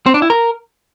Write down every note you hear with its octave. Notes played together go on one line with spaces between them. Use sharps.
C4
D4
E4
A#4